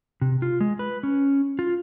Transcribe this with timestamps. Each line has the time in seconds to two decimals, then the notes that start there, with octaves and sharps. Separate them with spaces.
0.21 C3
0.42 F4
0.61 G#3
0.79 B4
1.03 C#4
1.59 F4